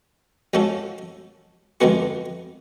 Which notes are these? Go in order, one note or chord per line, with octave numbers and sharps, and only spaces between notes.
F3 G#3 C#4 F#4 A4
F2 D3 G#3 B3 F#4